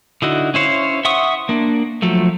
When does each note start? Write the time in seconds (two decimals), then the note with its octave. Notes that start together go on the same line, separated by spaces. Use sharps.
0.22 D3 D#4 E4 F#4
0.54 C#4 E4 C5 C#5 F5
1.05 E5 F#5 C6 C#6 D#6
1.49 A#3 D4
2.02 F3 F#3 A3